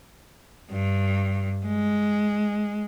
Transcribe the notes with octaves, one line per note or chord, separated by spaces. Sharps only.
G2
G#3